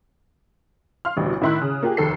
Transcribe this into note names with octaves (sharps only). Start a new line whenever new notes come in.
F5 C6 F6
A1 D2 B2 G3
A2 D#3 E4 C6 F#6
C#3
A#3 F4 G4 G#4
F1 D#2 A4 C7